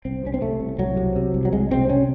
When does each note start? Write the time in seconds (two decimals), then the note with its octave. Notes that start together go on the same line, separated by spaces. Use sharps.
0.05 C2 C4
0.23 C3 C#4
0.34 C4
0.42 C3 A3
0.60 C2
0.78 C2 F#3
0.97 C3
1.16 C3
1.34 C2
1.45 F#3
1.53 C2 G#3
1.71 C3 C4
1.89 C3 C#4